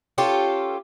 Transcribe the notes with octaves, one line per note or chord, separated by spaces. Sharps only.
C#4 F4 G4 A4